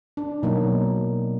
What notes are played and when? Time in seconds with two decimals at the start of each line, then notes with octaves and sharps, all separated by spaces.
0.17 D4
0.43 B2 F#3 A#3 D#4